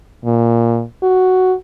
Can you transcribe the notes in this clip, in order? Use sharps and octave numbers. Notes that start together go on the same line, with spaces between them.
A#2
F#4